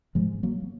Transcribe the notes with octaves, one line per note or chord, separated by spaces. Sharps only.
G#2 F3 G#3
F#3 A#3